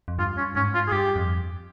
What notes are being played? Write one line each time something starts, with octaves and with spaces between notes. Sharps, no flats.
F2
G2 F4
C#4
G#2 C#4
F4
G#4
G2 G4
F2